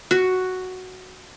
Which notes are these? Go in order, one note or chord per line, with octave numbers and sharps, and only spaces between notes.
F#4